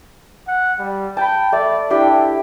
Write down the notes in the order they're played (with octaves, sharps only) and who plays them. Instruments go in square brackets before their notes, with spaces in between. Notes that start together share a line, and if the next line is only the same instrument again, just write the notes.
[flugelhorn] F#5
G3
[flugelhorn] G5 [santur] A5 B5
[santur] A3 [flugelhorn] D5
[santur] D4 G4 G5 [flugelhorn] E4